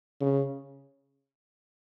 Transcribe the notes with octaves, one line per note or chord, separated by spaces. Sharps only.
C#3